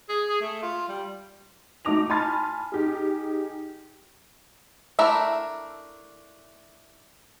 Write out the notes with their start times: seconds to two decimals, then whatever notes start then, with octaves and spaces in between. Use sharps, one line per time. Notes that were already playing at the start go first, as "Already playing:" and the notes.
0.09 G#4
0.29 G#4
0.41 A3
0.63 F4
0.89 G3
1.85 A3 D#4 F#4 D6 A#6 F7
2.10 G#5 A5 B5 C6 F6 A6
2.72 D#4 G4 G#4
4.99 A3 D4 E4 A#4 E5